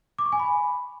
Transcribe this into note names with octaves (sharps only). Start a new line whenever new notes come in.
D6
C#6
G#5
B5